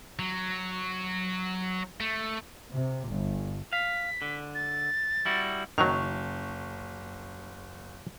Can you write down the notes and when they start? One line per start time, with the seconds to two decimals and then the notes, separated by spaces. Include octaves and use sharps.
0.19 F#3
2.00 A3
2.72 C3
3.09 G1
3.73 F5 B6
4.22 D3
4.55 A6
5.26 G3 E4 F#4
5.78 F#1 D#3 F#3 C#6 F7